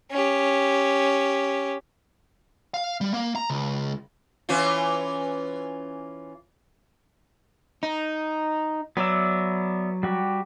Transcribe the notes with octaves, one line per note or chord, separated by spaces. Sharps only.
C#4 G4
F5
G3
A#3
A#5
C#2
E3 C#4 F4
D#4
F#3 B3 D5 E5
G3 F#4 G4